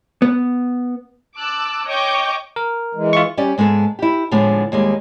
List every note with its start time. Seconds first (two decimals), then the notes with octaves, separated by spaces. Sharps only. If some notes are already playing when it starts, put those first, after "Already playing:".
0.22 B3
1.38 A5 D6 E6 F#6
1.88 C#5 D#5 G5 C#6 D6 G6
2.56 A#4
2.95 E3 G#3
3.13 F4 E5 C#6
3.37 G3 C#4 G4 D5
3.58 G#2 G#3 B3 A4
3.99 E4 G4
4.31 A2 D3 F3 G#3 B3
4.72 D#2 G3 G#3